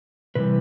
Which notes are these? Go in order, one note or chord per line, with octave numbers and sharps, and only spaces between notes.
C3 E3 G3 B4